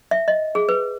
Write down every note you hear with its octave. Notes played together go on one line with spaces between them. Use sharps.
E5
D#5
G#4
B4